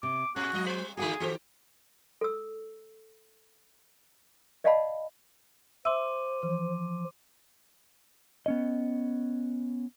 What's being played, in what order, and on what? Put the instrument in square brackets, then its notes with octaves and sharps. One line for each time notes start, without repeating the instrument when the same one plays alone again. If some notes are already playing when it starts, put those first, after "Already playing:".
[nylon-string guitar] C3 [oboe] D6
[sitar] A#2 G#4 [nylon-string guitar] C#4 [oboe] F#4
[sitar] F2 G#4 D#5 [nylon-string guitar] F#3 G#3
[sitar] G3 C4 [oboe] C5
[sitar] D3 G#3 A3 [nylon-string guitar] F#4 F#5 G#5 [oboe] G#4
[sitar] D#3 G4 [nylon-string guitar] F#4 A4 C5
[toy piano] A4 E6
D5 D#5 F5 F#5 A5 B5
[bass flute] C5 [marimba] E5 E6 [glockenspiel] C6 D6 D#7
[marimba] E3 [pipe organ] F3
[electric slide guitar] B3 C#4 D#5